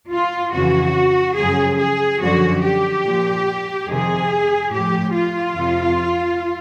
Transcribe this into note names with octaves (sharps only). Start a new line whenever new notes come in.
F4
F2 C#3 E3 F#4
F#2 C#3 F3 G#4
G#4
F#2 D3 F3 F#4
G4
A#2 F3
F2 C3 D#3 G#4
A2 F3 G4
F4
F2 C3 F3